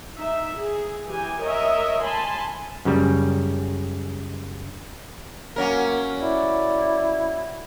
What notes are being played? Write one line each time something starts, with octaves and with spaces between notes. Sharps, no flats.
D#4 E5
G#4
E3 G4 G#5
A#4 C#5 D#5 E5
G#5 A5 B5 C6
F#2 C#3 G3
F#3 A#3 C#4 A#4
E4 D5